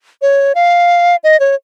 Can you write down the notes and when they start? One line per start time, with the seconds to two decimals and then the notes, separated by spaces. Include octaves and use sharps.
0.22 C#5
0.55 F5
1.24 D#5
1.40 C#5